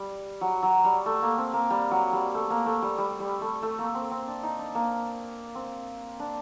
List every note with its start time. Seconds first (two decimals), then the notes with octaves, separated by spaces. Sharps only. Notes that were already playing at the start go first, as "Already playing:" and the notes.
Already playing: G3
0.41 F#3
0.63 F#3
0.84 G3
1.06 A3
1.22 A#3
1.38 C4
1.53 A#3
1.70 G3
1.91 F#3
2.13 G3
2.34 A3
2.50 A#3
2.66 A3
2.82 G3
2.98 G3
3.20 G3
3.41 A3
3.63 A3
3.79 A#3
3.95 C4
4.11 C4
4.28 D4
4.43 D#4
4.59 D4
4.75 A#3
5.55 C4
6.20 D4